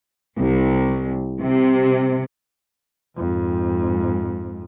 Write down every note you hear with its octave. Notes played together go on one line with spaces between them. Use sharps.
C2
C3
F2 G#2